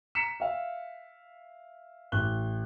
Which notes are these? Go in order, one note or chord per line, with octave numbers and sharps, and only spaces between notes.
A#5 B6 C#7 E7
E5 F5
A1 F#6 G7